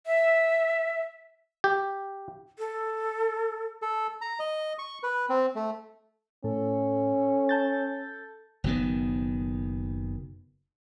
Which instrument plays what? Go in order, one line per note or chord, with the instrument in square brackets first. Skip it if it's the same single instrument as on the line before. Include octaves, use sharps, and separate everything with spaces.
[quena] E5
[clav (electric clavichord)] G4
[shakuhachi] A4
[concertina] A4
A#5
D#5
C#6
B4
C4
A3
[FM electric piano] A2 [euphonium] C#4 [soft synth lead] A4
[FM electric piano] A5 G6 A6
[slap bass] F#1 B2 D#3 B3